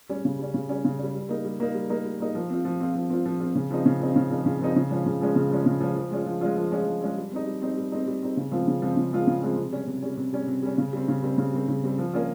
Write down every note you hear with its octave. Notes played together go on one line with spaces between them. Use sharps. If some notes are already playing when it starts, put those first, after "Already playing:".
G3 C#4
C#3
G3 C#4
C#3
G3 C#4
C#3
G3 C#4
G3
A#3 D#4
G3
A#3 D#4
G3
A#3 D#4
G3
A#3 D#4
F3
C4 F4
F3
C4 F4
F3
C4 F4
F3
C4 F4
C#3
F3 C4 D#4
C#3
F3 C4 D#4
C#3
F3 C4 D#4
C#3
F3 C4 D#4
C#3
F3 G#3 C#4
C#3
F3 G#3 C#4
C#3
F3 G#3 C#4
C#3
F3 G#3 C#4
F3
G#3 C#4 F4
F3
G#3 C#4 F4
F3
G#3 C#4 F4
F3
G#3 C#4 F4
G3
C4 D#4
G3
C4 D#4
G3
C4 D#4
G3
C4 D#4
C#3
F3 G#3 C4 F4
C#3
F3 G#3 C4 F4
C#3
F3 G#3 C4 F4
C#3
F3 G#3 C4 F4
C3
G3 C#4
C3
G3 C#4
C3
G3 C#4
C3
G3 C#4
C#3
G3 C4
C#3
G3 C4
C#3
G3 C4
C#3
G3 C4
F3
A#3 C#4 F4